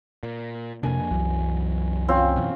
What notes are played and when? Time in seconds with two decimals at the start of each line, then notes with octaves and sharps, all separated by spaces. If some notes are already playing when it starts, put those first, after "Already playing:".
0.23 A#2
0.83 F2 C3 A#3 D4 G#5
1.11 C2 F#2 E3 F#3
2.08 C4 C#4 F4
2.36 F#2 B2 E3